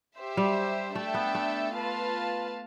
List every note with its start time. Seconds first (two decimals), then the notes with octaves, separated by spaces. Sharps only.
0.18 G4 C5 E5
0.37 G3
0.95 A3 D4 A4 E5 G5
1.14 B3
1.35 A3
1.73 F4 B4 F5 A5